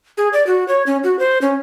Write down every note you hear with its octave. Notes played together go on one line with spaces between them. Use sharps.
G#4
D5
F#4
C#5
C#4
F#4
C5
C#4